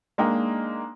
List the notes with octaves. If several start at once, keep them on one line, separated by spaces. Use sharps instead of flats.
G#3 A#3 D4 D#4 D#5 G5